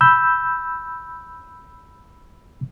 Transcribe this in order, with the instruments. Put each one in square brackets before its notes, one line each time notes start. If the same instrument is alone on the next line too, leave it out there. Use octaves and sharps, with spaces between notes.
[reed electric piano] B5 E6 G6